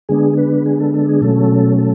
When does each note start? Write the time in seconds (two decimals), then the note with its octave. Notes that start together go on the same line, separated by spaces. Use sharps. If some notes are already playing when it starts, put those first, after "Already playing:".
0.09 D3 G#3 B3 D4 G#4
0.38 B4
0.66 G#4
0.80 A4
0.94 A4
1.08 G#4
1.22 B2 F#3 A3 C#4 A4
1.78 A4